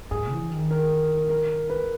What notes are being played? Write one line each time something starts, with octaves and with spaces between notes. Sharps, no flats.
G#2 G#4
E3
D#3
A#4
A#4
B4